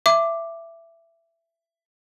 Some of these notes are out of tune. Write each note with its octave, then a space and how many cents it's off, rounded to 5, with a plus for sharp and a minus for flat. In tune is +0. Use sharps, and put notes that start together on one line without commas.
E5 +15 D6 +0